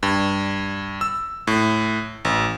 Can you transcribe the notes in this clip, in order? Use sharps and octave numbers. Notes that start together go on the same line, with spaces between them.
G2
E6
A2
A1